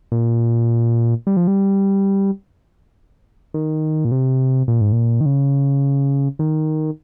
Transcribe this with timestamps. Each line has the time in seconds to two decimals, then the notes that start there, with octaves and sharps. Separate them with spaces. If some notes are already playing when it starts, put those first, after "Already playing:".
0.12 A#2
1.27 G3
1.37 F3
1.47 G3
3.54 D#3
4.05 A#2
4.11 C3
4.68 A#2
4.81 G#2
4.92 A#2
5.21 D#3
5.26 C#3
6.39 D#3